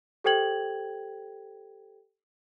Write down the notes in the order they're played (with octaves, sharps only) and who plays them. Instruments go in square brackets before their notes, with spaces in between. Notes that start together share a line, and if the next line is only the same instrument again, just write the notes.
[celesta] G4 A4 C5 G5 G#6 F#7